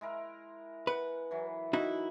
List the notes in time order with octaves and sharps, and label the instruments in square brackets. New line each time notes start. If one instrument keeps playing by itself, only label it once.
[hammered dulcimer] G#3 E4 A#4
[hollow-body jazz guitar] B4 [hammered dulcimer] F#5
[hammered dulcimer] E3 F#3
[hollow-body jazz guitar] D#4 E4 F#4